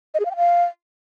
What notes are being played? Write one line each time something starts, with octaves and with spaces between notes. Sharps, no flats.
D#5
G#4
F5
G5
F5